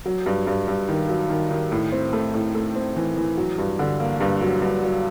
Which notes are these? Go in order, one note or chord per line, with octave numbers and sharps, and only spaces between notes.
F#3
G2
G2
G2
D#3
F#3
D#3
D#3
A2
C4
A3
A2
A3
C4
E3
E3
F#3
G2
D3
A#3
G2
F#3
G2
F#3